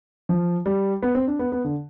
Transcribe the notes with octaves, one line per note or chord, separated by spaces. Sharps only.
F3
G3
B3
C4
D4
B3
B3
D3